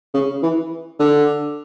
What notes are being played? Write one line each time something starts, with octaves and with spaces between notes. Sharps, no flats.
C#3
E3
D3